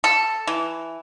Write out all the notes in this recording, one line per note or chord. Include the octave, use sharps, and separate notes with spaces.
A4
E3